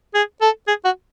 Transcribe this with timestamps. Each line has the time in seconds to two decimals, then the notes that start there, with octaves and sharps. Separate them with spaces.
0.14 G#4
0.41 A4
0.68 G#4
0.85 F#4